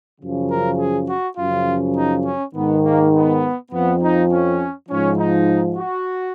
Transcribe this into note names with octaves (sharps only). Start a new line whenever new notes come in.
F#2 C#3 F3
A#4
G#4
F#4
F#2 C#3 F3 F4
D#4
C#4
G#2 D#3 B3
A#3
B3
F2 F3 B3
D#4
C#4
G#2 F3 C#4
D#4
F#4